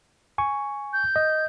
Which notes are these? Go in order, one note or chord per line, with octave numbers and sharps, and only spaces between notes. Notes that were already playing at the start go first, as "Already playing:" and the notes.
G#5 C#6
G6
D#5